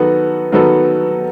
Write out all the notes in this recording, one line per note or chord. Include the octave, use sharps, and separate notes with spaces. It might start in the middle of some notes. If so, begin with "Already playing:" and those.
Already playing: D#3 F#3 B3 F#4 A4
D#3 F#3 B3 F#4 A4